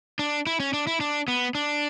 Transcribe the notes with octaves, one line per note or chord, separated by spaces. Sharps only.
D4
E4
C#4
D4
E4
D4
B3
D4